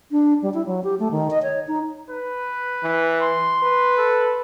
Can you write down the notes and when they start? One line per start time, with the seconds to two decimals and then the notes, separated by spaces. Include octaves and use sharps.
0.11 D4
0.42 G3
0.54 E4
0.66 F#3
0.84 G4
0.99 A3
1.11 D#3
1.30 D#5
1.43 C#5
1.68 D#4
2.10 B4
2.84 E3
3.21 C6
3.63 B4
3.97 A4